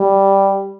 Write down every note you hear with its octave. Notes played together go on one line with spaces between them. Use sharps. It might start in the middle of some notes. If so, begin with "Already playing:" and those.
Already playing: G3